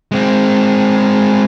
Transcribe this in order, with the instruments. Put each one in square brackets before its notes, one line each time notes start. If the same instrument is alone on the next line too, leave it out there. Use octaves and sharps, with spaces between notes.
[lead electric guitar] G#3 C4